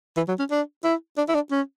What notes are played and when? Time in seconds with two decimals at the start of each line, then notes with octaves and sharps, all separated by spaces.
0.17 E3
0.28 F#3
0.39 C#4
0.51 D4
0.84 E4
1.18 D4
1.29 E4
1.35 D4
1.51 C#4